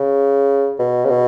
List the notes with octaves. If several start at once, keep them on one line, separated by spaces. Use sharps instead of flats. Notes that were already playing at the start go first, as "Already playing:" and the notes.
Already playing: C#3
B2
C#3
B2